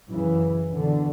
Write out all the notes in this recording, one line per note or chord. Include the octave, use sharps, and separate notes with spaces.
F#2 C#3 E3
E2 B2 D3